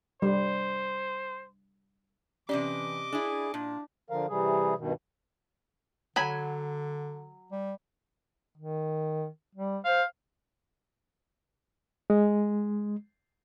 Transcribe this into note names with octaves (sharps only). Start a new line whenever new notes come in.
G3 C5
C3 E3 C#4 D4 G4 D5 D#5 D6
D4 E4 G#4
A#2 D4
D3 F3 A#4 F5
C3 E3 G3 G#4
G2 B2 D#3
D3 F#3 G#5 B5
G3
D#3
G3
C5 F5
G#3